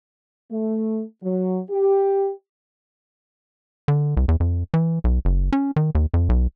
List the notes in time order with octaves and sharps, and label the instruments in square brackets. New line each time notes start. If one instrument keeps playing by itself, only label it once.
[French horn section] A3
F#3
G4
[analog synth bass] D3
C2
E2
F2
E3
B1
F#1
C#4
D#3
D#2
F2
B1